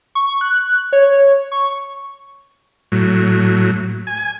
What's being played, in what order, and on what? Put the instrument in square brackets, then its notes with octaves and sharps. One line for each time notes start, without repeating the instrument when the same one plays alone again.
[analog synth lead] C#6
F#6
C#5
C#6
[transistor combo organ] A2 F#3
G#5